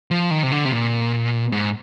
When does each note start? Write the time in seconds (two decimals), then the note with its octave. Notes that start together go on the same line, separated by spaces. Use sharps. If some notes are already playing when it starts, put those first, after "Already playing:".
0.11 F3
0.31 D#3
0.43 C3
0.51 D3
0.65 C3
0.72 A#2
1.52 G#2